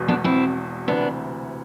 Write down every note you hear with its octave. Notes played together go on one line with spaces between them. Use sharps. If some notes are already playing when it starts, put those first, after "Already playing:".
Already playing: E1 E2 B2
B3 D4
C4 E4
D2 C3 E3 B3 D4